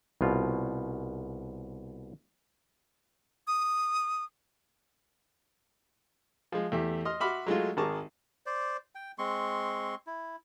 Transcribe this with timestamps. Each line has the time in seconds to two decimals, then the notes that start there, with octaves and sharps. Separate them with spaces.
0.21 C2 B2 F4
3.47 D#6
6.52 F3 G#3
6.72 E2 A3 G4 E5
7.05 D#5 C6 F6
7.20 F#4 E5 B5 C6 D6 F6
7.47 F#3 G#3 A3 F4
7.77 G#1 G#4 A#4 A5 C#6 D6
8.46 C5 D5
8.95 G5
9.18 G#3 C4 C6 C#6
10.07 E4